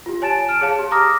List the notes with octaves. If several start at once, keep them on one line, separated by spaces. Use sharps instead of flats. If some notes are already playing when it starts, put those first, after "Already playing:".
F4 G4
C#5 G#5 A5 A6 D7 E7
F6 D7 E7
G#4 C#5 F5 A5
G4
A#5 D6 D#6 F6 A#6